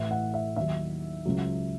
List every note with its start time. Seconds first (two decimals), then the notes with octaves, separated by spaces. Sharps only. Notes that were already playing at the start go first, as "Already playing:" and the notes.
Already playing: A1 A2 E3 E5
0.11 F#5
0.34 E5
0.56 D#2 D#3 F#3 E5
1.25 C#2 C#3 F#3